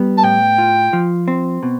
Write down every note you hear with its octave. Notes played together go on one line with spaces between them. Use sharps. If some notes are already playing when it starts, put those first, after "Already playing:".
Already playing: G3 B3
A5
A2 G5
F4
F3
C4
B2